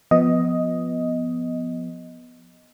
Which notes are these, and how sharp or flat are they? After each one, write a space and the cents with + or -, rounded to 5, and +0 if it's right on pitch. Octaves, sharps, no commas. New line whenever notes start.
F3 +0 B3 +0 D#5 +5